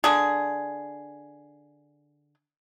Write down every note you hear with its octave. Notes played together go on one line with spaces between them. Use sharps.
D3 D4 G#4